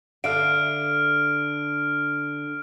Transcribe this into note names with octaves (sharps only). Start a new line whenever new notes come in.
D3 E5 F5 F6 D7